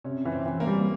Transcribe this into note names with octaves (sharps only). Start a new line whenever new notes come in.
C3 C#4
E3
C4
E3
A#3
G3